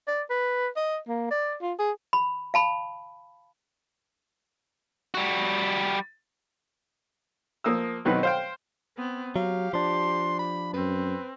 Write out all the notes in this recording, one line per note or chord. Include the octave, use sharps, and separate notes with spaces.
D5
B4
D#5
A#3
D5
F4
G#4
B5
F5 A5 B5
G3 F#4
F3 A#3 D#6 E6
B2 D#3 F#3 C4 D#4 B4
C5 F5 G5
B3 C4
F#3 G4 F5
F3 D4 C6
B5
F#2 C4 B4